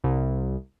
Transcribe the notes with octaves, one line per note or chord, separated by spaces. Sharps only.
C2